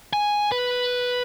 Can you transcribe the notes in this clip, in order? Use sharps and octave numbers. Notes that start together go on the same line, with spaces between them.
G#5
B4